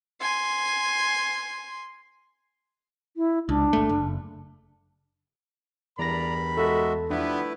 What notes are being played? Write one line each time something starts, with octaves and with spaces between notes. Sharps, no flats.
G#5 C6
E4
C#2 D4
G1 A3
F#1
E2 G2 A#4 D5 A#5 B5 A#6
G#3 F#4 A4 E5
F3 G3 A3 B3 D4 E4 B4